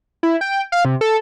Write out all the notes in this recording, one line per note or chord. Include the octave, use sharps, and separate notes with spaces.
E4
G5
F5
C3
A4